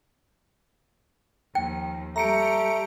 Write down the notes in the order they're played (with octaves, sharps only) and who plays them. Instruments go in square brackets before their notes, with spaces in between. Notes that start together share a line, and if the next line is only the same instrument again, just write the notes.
[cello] D#2 F3 [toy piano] G5
[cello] G3 G4 [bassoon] A3 [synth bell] A#5 C#7 D7